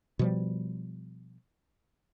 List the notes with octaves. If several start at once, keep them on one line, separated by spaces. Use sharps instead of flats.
B2 F3 G3